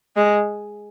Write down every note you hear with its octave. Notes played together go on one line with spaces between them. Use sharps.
G#3